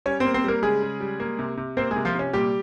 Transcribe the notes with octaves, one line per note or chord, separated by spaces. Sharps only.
G3 C#4 C#5
A#3 C4 C5
C4 C5
G3 A#3 A#4
C#3 G#3 G#4
C#3
G3
A#3
C3
C3
A#3 C4 C5
G#3 G#4
C3
F3 F4
C3 C#4
A#2 G3 G4